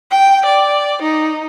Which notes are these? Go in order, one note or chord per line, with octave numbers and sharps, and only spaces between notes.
G5
D5
D#4